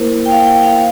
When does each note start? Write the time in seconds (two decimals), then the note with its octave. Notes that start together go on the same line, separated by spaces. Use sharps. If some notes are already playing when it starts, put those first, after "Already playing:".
Already playing: A#3 E4 A#4 C5
0.26 G5
0.31 F5
0.47 G5
0.63 F5
0.74 F5